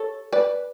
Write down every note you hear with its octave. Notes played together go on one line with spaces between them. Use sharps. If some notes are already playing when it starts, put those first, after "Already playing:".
Already playing: A4 C#5
B4 D5